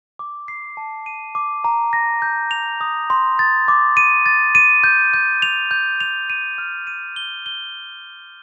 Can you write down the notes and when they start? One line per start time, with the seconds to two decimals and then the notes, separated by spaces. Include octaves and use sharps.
0.19 D6
0.48 C7
0.77 A5
1.06 D#7
1.35 D6
1.64 A#5
1.93 A#6
2.22 G6
2.51 F7
2.81 D#6
3.10 C6
3.39 A6
3.68 D6
3.97 D#7
4.26 A6
4.55 D#7
4.84 G6
5.14 G6
5.42 F7
5.71 G6
6.00 F7
6.30 D#7
6.58 F6
6.87 D#7
7.16 G7
7.46 G7